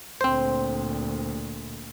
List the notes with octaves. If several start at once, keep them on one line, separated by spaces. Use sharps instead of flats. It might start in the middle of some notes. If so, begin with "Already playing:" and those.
D2 A#2 C4 C5